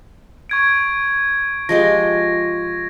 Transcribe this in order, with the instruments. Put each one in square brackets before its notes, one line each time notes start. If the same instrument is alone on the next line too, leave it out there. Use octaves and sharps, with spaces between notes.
[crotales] C#6 G#6 D7
[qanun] F3 G#3 G4 [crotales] A#6